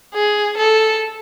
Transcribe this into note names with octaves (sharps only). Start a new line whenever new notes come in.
G#4
A4